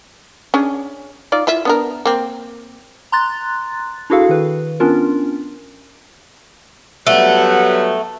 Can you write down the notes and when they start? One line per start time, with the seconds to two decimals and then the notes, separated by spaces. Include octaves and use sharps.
0.54 C#4 D4 G#4
1.32 D#4 F4 D5
1.47 E4 F4 E5
1.65 B3 D4 A#4
2.05 A#3 C4
3.12 A#5 C6 F#6 A6
4.10 D4 E4 F#4 G#4 A4 F5
4.29 D#3 B4
4.80 B3 C#4 D4 F4 A#4
7.07 F#3 G3 A3 B3 F#5